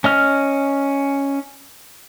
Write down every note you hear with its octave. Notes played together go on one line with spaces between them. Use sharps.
C#4 D#5 F6